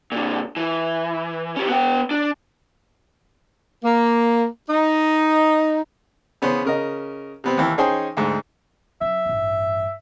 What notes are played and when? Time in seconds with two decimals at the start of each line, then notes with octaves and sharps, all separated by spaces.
0.12 A#2 D3
0.56 E3
1.56 C#4 G4
1.68 B3 G5
2.11 D4
3.83 A#3
4.70 D#4
6.42 C#3 B3 C#4 C5
6.65 C#3 A#4 D#5
7.44 C3 B3 C4
7.58 D#2 E3 G5
7.78 C#4 D#4 G#4 C5 G5 G#5
8.17 D2 G#2
9.01 F#3 C#4 E5
9.26 A1 G2